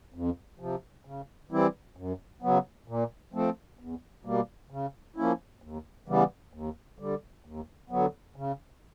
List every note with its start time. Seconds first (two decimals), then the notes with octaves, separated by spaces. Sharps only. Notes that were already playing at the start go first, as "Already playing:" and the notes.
0.14 F2
0.59 C3 F3
1.05 C#3
1.51 E3 G3 C4 E4
1.97 F#2
2.42 C#3 F#3 B3
2.88 A#2
3.33 F3 A3 C4
3.79 E2
4.25 B2 G3 A#3
4.70 C#3
5.16 F3 A#3 C#4 E4
5.62 D#2
6.07 C#3 E3 G3 B3
6.53 D#2
6.99 D3 G3
7.45 D#2
7.90 D3 F#3 B3
8.36 C#3